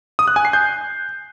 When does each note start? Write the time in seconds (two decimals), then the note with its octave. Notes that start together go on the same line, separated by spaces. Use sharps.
0.19 D#6
0.28 F#6
0.36 G#5
0.45 C7
0.53 G6